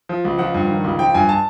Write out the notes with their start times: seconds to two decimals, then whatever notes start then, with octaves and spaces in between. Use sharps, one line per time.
0.09 F3
0.25 C#2
0.38 F3 F#5
0.54 G2
0.69 D#3
0.84 C#2
0.99 F3 G5
1.14 G2 G#5
1.29 A5